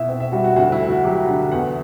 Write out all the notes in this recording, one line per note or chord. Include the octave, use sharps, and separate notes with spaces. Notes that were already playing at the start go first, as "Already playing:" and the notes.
Already playing: B2 E4 E5
C4
E5
G3 F#4
F#4
D2 F#4
E4
A3
F#4
F#3 G4
D3
E2 F#5